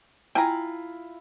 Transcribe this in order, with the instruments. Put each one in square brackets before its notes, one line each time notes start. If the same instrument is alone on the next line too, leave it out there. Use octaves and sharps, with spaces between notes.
[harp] E4 F4 [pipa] G5 G#5 A#5